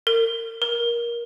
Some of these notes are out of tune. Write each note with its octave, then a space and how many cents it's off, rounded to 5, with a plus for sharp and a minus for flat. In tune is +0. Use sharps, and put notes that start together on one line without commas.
A#4 -35
A#4 +20